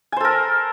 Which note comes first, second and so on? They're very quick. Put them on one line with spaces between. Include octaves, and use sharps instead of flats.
G#5 C5 A4 A#4